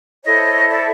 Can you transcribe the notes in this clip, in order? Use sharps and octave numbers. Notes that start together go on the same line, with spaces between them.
E4 A4 C5 C#5 D#5
D5 E5